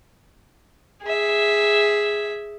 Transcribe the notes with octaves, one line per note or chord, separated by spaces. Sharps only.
G#4 E5